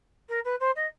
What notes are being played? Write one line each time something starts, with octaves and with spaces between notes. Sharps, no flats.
A#4
B4
C5
D#5